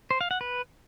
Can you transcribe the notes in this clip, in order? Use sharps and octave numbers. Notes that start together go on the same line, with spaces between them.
C5
F5
F#5
B4